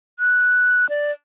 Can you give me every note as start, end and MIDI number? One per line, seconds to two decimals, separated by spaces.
0.19 0.88 90
0.89 1.12 74